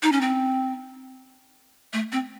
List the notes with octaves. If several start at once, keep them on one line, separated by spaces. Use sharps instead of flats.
D#4
C#4
C4
A3
C4